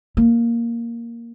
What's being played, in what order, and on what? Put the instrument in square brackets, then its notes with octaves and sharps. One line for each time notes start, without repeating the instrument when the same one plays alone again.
[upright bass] A#3